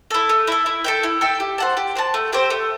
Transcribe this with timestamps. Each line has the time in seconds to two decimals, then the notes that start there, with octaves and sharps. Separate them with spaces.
0.11 E4 A4
0.29 A3
0.47 E4 A4
0.66 E4
0.84 A4 E5 G5
1.03 E4
1.21 A4 E5 G5
1.40 G4
1.58 C5 F#5 A5
1.77 G4
1.96 C5 F#5 A5
2.14 A3
2.33 C4 G4 C5
2.50 A3